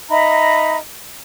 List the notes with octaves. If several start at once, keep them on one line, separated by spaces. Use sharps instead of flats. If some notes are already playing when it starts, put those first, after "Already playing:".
D#4 E5 A#5 B5